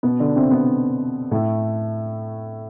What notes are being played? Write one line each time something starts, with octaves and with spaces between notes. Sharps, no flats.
B2 B3
D3 D4
C3 C4
B2 B3
A2 A3